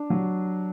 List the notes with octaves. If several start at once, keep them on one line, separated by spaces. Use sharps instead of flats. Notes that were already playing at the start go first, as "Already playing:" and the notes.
Already playing: D4
F#3